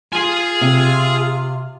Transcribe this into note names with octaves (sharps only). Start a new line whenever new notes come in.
F4 G#4 G#5
C3